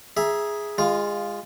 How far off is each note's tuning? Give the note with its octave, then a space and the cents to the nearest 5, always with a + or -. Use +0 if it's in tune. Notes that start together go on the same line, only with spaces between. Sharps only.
G#4 +0 E5 +0 A#5 +25
G#3 -25 F4 +0 F5 +5